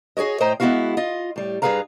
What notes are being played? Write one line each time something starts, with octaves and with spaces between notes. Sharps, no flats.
F#4 G#4 A#4 C#5 D#5
A2 C5 D#5 G5 A#5
G#3 B3 C4 E4 F#4 F5
F4 D#5
A2 G3
G2 F3 G#4 B4 F5 A#5